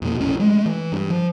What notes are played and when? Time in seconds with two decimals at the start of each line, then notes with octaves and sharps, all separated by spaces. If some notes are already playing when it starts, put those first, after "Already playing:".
0.02 F2 B2 A#3
0.20 A#1 C#4
0.39 G#3 A3
0.66 E3
0.92 G2
1.10 F3